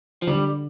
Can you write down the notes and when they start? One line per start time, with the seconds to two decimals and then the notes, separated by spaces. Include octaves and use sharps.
0.22 F3
0.27 D3 G3